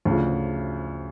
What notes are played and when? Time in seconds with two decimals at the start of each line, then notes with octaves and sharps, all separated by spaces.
0.05 D2 C#3 F3